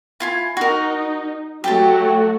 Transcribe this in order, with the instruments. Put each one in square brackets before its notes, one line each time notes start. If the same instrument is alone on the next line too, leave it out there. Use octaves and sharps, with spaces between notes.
[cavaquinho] E4 F4 G#5
[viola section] D#4 [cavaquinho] F#4 A#4
[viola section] F#3 A3 F#4 [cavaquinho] G4 G5 A5